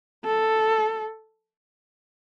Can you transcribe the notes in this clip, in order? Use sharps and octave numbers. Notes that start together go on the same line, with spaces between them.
A4